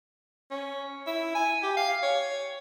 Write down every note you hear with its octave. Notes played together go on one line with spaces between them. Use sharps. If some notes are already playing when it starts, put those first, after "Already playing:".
C#4
E4
G#5
G4
F5
C#5